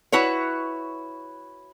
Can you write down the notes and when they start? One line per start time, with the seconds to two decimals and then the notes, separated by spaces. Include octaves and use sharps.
0.12 E4 F#4 B4 C#5